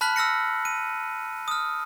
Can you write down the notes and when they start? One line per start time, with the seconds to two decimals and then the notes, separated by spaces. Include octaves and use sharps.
0.01 A5 B5 F6 F#6 B6 F#7
0.16 E6 F6 A#6 C#7
0.65 D#7
1.48 D#6 F6